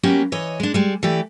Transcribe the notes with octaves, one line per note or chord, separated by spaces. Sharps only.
F#3 A#3 B3 C#4 G4
E3 C#5 D#5
G#3 D4
G3 G#3
E3 A3 G4 D5